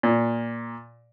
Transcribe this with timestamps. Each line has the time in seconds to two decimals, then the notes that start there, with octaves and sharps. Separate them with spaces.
0.03 A#2